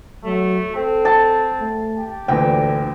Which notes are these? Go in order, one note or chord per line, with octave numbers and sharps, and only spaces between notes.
F#3 A3
C4 A4
A5
A3
G4
D2 A#2 D3 E3 G5